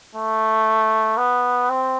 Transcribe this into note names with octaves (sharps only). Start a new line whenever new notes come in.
A3
B3
C4